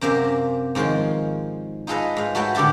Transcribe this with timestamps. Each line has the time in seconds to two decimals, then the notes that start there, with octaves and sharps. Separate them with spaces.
0.01 F#2 C3 A#3 C5 E5
0.75 G#2 D#3 F3 C#5 C6
1.87 D#4 F4 G#4 A4 B4 D#5
2.16 G#2 F5
2.35 A3 F#4 A4 B4 C#5 G5
2.55 A2 D3 G4 A4 A5